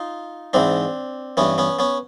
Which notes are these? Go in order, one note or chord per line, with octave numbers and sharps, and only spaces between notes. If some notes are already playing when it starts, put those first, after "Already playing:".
Already playing: D#4 F4
G#2 E3 C4 D4
G2 E3 B3 C#4
B3 C#4
B3 C#4